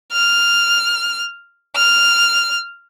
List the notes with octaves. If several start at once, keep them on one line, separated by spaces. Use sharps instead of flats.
F6
F6